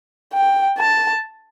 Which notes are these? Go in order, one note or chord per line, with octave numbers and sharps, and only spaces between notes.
G5
A5